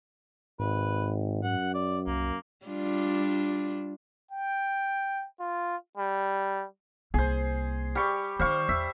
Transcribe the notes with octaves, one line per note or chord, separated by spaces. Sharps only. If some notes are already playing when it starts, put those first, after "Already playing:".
G#1 G#2 B4
F#2 F#5
D5
C2 A#3
G3 D4 F4
G5
F4
G3
C2 A#3 G#4 C5
G3 G4 C#6
D3 D#3 C5 F5 C#6
E2 E5